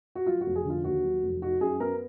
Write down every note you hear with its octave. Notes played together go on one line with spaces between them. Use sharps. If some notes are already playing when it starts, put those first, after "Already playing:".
F#4
F#3 F4
F#4
F1
G#4
D3 F4
D#2 F#4
F#3
F1
D#4 F#4
F#2 G#4
B3 A#4